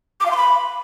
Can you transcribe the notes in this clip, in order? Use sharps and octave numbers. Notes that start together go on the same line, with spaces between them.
D6
F5
C6
B5